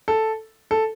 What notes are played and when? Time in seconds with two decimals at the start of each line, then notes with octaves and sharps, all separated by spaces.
0.08 A4
0.71 A4